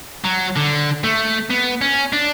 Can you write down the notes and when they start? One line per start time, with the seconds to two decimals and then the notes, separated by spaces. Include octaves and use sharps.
0.25 F#3
0.57 D3
1.04 A3
1.50 B3
1.81 C#4
2.13 D4